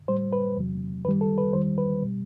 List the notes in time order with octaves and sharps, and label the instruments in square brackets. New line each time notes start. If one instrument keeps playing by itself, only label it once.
[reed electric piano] A2 G3 C5
B4
E2 C3 F#3
F#2 D#3 G3 B4
A4
B4
E2 D#3 G3 C5
B4
B2 G3